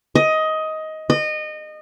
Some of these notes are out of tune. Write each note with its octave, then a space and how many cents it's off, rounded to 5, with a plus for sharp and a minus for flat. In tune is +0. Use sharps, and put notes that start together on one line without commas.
D#5 +15
D#5 -25